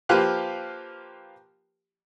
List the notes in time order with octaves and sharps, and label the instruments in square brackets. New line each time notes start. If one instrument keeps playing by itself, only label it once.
[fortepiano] F3 A#3 F4 G4 B4 F#6